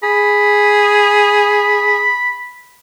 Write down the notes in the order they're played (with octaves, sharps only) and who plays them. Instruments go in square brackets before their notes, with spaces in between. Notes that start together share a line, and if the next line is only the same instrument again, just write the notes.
[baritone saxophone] G#4 [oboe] B5